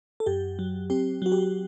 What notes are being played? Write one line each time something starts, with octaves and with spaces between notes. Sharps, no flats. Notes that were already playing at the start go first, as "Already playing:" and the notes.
A4
F#2 G4
F#3
C4 G4
F#3 F#4
G4